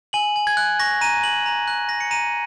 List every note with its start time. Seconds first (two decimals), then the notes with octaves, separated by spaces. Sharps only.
0.13 G#5 F#7
0.36 G#5
0.47 G#6
0.57 F#6
0.80 C#6 A#6
1.01 A#5 D#7
1.23 A#5 F#7
1.46 A#5
1.68 F#6
1.89 F#6 A#6
2.00 C#7
2.11 A#5 D#7